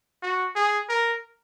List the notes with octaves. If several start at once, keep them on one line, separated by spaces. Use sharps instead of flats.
F#4
G#4
A#4